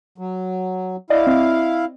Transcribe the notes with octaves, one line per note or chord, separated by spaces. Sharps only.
F#3
E4 D5 D#5 F5
C4